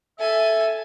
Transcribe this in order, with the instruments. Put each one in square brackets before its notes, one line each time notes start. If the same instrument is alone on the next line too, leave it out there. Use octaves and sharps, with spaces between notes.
[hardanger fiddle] A4 G#5 [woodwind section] E5